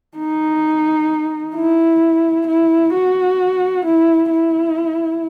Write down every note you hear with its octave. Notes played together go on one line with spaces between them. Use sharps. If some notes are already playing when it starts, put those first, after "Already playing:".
D#4
E4
E4
F#4
E4
E4